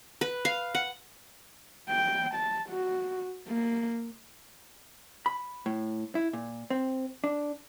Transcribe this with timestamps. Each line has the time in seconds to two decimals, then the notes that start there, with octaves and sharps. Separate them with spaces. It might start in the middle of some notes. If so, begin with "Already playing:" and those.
0.21 B4
0.45 F5
0.75 F#5
1.90 G5
2.35 A5
2.70 F#4
3.49 A#3
5.26 B5
5.66 A2
6.15 E4
6.33 A#2
6.70 C4
7.24 D4